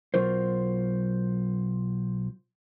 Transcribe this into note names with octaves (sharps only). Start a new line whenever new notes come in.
B1 F#3 F4 A#4 C5